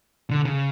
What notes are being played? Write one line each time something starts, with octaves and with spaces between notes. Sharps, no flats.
D3
C#3